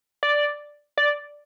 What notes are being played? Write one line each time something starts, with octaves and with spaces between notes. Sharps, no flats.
D5
D5